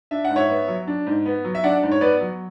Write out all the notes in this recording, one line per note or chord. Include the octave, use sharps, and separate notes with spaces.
D4 E5
F#5
G#2
C#5 E5
B3
F#3
D4
G#2
B3
F#3
E5
D4 D5 F#5
G#2
C#5
B3 B4 D5
F#3